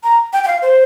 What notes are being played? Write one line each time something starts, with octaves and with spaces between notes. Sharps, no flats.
A#5
G5
G5
F5
C5